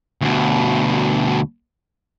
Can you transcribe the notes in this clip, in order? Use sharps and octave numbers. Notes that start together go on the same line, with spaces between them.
D2 B2